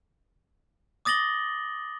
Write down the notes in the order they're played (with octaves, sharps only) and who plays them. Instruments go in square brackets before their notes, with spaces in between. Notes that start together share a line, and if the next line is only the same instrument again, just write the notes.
[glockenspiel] D6 D#6 A6 A#6 F#7 G7